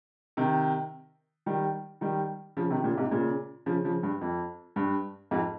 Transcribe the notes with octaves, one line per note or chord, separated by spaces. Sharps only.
C3 D#3
D#3 G3
D#3 G3
C#3 F3
C3 D#3
A#2 C#3
G#2 C3
A#2 C#3
C#3 F3
C#3 F3
G2
F2
G2
F2 G#2